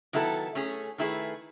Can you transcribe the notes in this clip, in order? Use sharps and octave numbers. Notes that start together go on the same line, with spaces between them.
D#3 F#3 B3 E4 A4
A3 C#4 G#4
D#3 A3 E4 G#4 B4